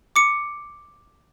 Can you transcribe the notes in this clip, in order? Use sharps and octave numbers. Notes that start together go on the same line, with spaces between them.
D6 C#7